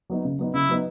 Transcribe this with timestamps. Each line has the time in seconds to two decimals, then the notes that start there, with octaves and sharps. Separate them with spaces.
0.10 F#3 B3 D#4
0.25 C#3
0.39 F#3 B3 D#4
0.54 C#3 E4
0.69 F#3 B3 D#4